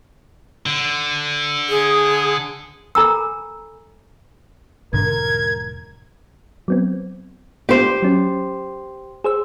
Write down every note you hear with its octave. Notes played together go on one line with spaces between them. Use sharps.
D3
G#4
A4 G#5 A#5 B5 E6
E1 G#2 D3 F3 A#4 G#6
F#3 B3 C4
B3 D4 F4 G4 C5
F#3 C#4
G#4 C5 E6